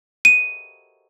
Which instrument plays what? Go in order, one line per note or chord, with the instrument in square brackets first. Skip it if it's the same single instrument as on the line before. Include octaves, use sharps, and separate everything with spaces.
[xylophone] D#7